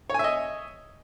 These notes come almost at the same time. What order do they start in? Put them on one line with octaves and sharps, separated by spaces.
C#5 G#5 E5 D#5